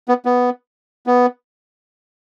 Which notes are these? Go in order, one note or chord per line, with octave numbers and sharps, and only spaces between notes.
B3
B3
B3